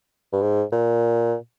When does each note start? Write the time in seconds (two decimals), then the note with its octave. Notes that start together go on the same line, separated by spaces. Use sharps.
0.33 G2
0.42 G#2
0.72 A#2